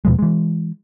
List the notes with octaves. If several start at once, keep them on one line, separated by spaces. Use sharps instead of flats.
E2 B2 F3 G#3
E3 G#3